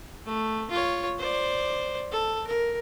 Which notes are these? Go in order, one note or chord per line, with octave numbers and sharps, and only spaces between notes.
A3
F4 C#5
C5 D5
A4
A#4